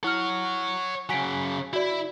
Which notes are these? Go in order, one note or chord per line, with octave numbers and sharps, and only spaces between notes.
E4 C#5 F#5 F6
C#3 F#3 G#5 B6 D7
E4 F#4 D5